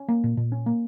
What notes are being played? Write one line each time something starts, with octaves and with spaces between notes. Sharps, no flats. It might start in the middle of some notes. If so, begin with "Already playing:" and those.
Already playing: C#4
A#3
A#2
A#2
C#4
A#3